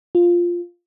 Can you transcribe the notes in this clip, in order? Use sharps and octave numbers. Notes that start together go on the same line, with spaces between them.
F4